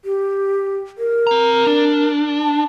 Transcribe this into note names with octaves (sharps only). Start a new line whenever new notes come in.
G4
A#4
C4 A#5
D4
A5